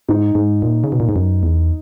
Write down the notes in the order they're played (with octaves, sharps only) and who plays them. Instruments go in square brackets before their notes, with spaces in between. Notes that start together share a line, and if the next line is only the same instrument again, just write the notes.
[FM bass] G#2 [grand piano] D#4
[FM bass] G#2
A#2
C#3
B2
A#2
G#2
F#2
E2